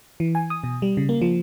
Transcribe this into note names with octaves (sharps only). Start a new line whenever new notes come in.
E3
G#5
D#6
B2
G3
C#3
A#3
F3